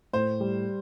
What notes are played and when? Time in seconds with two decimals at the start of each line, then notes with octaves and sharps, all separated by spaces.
0.13 A2 C5
0.40 G3